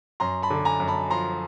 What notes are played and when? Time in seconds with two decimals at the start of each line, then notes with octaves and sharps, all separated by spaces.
0.20 F#2 A#5 C6
0.43 A5 B5
0.50 D3
0.65 G#5 A#5
0.80 F#2
0.88 A5 B5
1.10 F3 A#5 C6